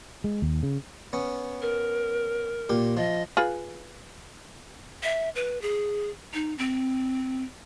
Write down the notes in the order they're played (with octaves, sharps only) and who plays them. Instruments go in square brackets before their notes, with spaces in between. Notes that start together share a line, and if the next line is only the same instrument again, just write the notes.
[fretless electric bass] G#3
D#2
C#3
[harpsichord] B3 C#4
[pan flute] A#4
[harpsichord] A#2 G4
[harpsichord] F3 [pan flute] D#5
[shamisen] F4 G#4 B4
[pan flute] E5
B4
G#4
D#4
C4